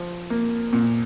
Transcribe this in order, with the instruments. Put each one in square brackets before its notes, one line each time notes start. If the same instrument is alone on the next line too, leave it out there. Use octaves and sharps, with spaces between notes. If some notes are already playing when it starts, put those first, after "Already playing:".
Already playing: [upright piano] F3
A#3
A#2